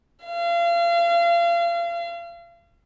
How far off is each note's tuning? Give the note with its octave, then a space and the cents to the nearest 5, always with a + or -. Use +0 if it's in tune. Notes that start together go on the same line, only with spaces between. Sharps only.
F5 -35